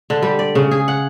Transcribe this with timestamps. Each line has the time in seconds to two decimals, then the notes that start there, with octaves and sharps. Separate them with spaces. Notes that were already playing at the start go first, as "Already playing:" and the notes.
0.10 D3
0.22 G3
0.39 D5
0.55 C#3
0.71 G#4
0.88 F#5